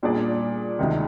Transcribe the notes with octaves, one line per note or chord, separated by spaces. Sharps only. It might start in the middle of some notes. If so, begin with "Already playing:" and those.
A#2 G3 D4 G#4 D5
D2 C3 D#3 G#3